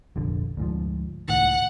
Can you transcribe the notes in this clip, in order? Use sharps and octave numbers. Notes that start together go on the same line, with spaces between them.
F1 A#1 D3
D2 G#2 F3
C#2 A2 D#3 F#5